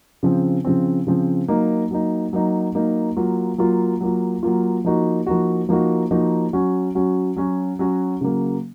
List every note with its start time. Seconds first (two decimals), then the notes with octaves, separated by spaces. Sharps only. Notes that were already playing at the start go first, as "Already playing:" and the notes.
0.23 C#3 F3 C4
0.65 C#3 F3 C4
1.07 C#3 F3 C4
1.48 F#3 A#3 D#4
1.91 F#3 A#3 D#4
2.33 F#3 A#3 D#4
2.75 F#3 A#3 D#4
3.17 F#3 A#3 F4
3.58 F#3 A#3 F4
4.01 F#3 A#3 F4
4.43 F#3 A#3 F4
4.85 F3 A#3 D#4 F#4
5.27 F3 A#3 D#4 F#4
5.69 F3 A#3 D#4 F#4
6.11 F3 A#3 D#4 F#4
6.53 F#3 C#4 F#4
6.95 F#3 C#4 F#4
7.36 F#3 C#4 F#4
7.79 F#3 C#4 F#4
8.21 C#3 F#3 A#3